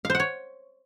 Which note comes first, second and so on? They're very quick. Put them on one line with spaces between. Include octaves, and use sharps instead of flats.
F5 C5 F#5 C#5